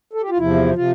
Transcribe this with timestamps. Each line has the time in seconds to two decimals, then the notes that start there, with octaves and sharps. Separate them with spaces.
0.13 A4
0.22 G4
0.30 F4
0.38 E2 C3 F3 E4
0.75 C3 F3 F4